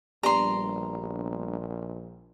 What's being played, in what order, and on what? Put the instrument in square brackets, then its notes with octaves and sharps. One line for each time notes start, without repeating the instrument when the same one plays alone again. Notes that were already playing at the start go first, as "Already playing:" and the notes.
[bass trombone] A#1 [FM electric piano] G3 B3 D4 [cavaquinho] A#5 C6